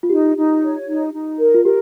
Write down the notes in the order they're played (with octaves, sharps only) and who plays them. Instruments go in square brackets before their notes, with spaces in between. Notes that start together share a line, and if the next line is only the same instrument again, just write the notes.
[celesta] F4
[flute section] D#4 [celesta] G4
[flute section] D#4
C#5
D#4
D#4
A#4
[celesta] F4
[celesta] G4 [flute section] A#4